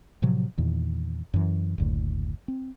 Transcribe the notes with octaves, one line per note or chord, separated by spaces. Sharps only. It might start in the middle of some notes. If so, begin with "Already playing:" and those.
A2 C3 F3 F#3
E2 A#2 D#3
F#2 E3
F#1 D2 A2
C4